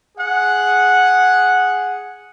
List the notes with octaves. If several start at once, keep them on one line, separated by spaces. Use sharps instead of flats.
G#4 F#5